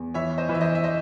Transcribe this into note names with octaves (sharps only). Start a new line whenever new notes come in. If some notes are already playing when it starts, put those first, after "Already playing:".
Already playing: E2
E3 C#5 E5
C5 D#5
E3
E5
C5 D#5
E5
C5 D#5